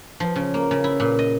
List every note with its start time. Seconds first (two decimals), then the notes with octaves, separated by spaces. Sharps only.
0.20 F3
0.36 C#3
0.54 A#3
0.71 C#3
0.84 E4
1.00 A#2
1.19 D#5